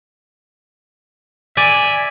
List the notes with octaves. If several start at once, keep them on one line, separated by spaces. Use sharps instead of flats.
D5 E5 G#5